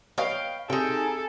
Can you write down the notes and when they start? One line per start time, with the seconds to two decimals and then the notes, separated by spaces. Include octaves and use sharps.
0.18 B4 C#5 D#5 F5 G5
0.70 C3 D#4 G#4 A4 G5 G#5